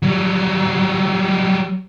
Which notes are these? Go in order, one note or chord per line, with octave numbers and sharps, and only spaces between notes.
F#3 G3